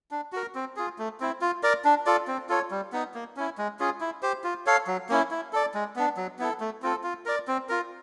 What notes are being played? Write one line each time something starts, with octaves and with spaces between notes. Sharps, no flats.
D4
F#4 A#4
C4
F4 G#4
A3
C4 E4
F4
A#4 D5
D4
F4 A4 D5
C4
F4 A4 C#5
G3
B3 D#4
A#3
C#4 E4
G#3
C#4 F4 G#4
E4
G4 C5
F4
A4 C#5 F5
F#3
A#3 C#4 E4
E4
A4 D5
G#3
B3 D4
F#3
B3 E4 A4
A3
C4 F4 A4
F4
A#4 D5
C4
F4 A#4